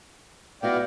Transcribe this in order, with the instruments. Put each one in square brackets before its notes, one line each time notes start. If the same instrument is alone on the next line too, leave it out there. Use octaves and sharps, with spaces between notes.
[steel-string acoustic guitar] B3 E4 F#4 [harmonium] D5 F5 G5